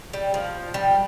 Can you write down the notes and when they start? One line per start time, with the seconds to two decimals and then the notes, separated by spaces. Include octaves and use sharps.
0.13 G3
0.34 F3
0.74 G3